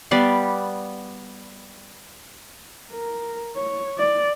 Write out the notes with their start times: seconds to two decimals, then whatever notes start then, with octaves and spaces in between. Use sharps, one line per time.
0.11 G3 B3 D5 F5
2.93 A#4
3.56 C#5
3.98 D5